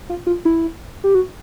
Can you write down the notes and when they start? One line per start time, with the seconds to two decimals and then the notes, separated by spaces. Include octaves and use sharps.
0.09 F4
0.27 F4
0.45 E4
1.04 G4
1.15 F#4